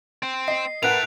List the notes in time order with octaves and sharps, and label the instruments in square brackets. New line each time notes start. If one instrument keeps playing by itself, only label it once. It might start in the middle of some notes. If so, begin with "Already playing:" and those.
[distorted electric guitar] C4
[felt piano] D#5 [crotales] C7
[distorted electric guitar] A2 A3 [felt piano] A#4 B4 F#5 [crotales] F#6 D7 F7